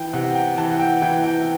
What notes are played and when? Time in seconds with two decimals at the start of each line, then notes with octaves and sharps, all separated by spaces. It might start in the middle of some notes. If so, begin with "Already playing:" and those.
Already playing: E3 G5
0.13 C3 F#5
0.35 G5
0.57 E3 A5
0.70 F#5
0.79 G5
1.02 E3 G5
1.24 G5